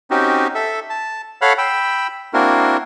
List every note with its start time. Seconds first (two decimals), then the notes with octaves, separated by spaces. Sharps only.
0.11 C4 C#4 D#4 F#4 G4
0.55 A4 E5
0.90 A5
1.42 A4 C#5 F5 F#5 B5 F6
1.58 G5 B5 E6
2.34 A#3 C4 D4 E4 F#4 A#4